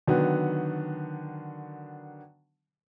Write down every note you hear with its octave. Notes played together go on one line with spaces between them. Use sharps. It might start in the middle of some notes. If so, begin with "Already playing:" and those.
D3 D#3 F#3 B3